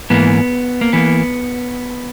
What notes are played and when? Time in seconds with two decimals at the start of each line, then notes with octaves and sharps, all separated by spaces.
0.10 G#2 E3 A#3 B3
0.81 A#3
0.93 E3 A#3 B3